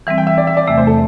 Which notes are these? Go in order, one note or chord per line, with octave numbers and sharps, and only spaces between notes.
E3 G3 C4 E5
G5
E5
D5
E5
D5
E2 C3 A3 E5
C5
A4